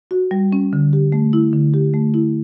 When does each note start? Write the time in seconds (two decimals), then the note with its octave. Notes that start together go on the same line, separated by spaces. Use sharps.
0.11 F#4
0.31 G3
0.53 C#4
0.73 D3
0.93 G4
1.12 A3
1.33 E4
1.53 D3
1.74 G4
1.94 A3
2.14 E4